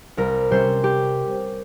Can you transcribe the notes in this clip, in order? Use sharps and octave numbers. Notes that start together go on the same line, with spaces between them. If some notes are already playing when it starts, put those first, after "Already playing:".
C2 A#4
C3 G3 C#4 C5
G4